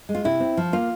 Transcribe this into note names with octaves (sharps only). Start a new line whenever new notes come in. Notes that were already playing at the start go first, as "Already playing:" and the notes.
G#3
F4
C3 E4
C4
F3
A#3 F4